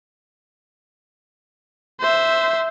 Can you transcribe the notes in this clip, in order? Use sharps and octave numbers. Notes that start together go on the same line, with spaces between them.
C5 E5